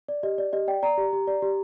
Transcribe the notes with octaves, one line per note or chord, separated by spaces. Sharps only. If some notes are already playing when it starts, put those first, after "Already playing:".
D5
G4 D#5
D5
G4 D#5
D5 G5
D5 A#5
G4
G4
D5
G4